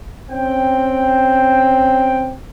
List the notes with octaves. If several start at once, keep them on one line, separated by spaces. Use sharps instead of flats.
C4 C#4 G5